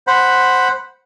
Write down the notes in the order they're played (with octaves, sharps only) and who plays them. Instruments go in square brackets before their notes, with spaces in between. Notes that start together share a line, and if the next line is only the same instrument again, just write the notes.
[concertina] C5 F#5 B5